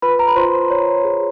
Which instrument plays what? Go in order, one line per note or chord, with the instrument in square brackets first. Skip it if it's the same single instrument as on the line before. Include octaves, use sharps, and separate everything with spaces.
[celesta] F4 B4 B5
A#5
B5
F4 C5 C6
C#5
G#4